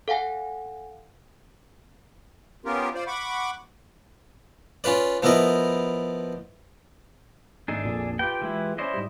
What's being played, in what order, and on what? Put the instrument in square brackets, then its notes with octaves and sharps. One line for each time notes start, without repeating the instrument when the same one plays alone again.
[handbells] A4 F5 F#5 G#5
[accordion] B3 C#4 F4 G4 A#4
F4 C5 D5
F#5 B5 C#6 D6
[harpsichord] C#4 F4 B4 D5
F3 B3 E4 A#4 D5 D#5
[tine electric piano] G#1 A3 D#4 [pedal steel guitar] D4 G#4 A4
[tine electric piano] A#1 F2 A#2
[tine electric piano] F4 G4 B4 [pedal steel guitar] G5
[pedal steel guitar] E3 G#3 E4
[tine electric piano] C#4 D5 [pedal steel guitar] E4 C5 D#5
[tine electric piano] G#2 G3